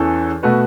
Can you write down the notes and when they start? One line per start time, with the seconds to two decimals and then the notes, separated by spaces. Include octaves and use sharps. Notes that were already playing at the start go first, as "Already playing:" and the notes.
Already playing: E2 E3 C#4 A4 C#5
0.43 B2 A3 F#4 B4